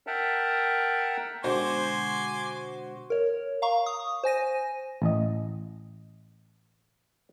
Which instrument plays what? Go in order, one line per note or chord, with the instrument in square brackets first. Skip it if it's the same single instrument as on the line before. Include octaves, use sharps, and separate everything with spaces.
[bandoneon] A#4 E5 F#5 G5 A5 A#5
[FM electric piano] B2 D3 G#3 [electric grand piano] F#4 [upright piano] C5 [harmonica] G#5 C6 D6
[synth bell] A#4 C#5
F5 A#5 C#6
D#6
C5 G#5 A#6 D#7
[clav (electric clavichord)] A1 D#5